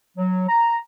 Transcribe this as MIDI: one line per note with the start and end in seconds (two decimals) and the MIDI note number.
0.17 0.45 54
0.48 0.77 82